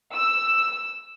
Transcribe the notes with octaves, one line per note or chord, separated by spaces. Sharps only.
E6